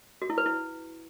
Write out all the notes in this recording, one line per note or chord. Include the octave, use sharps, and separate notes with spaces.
F#4
E4
B4
E4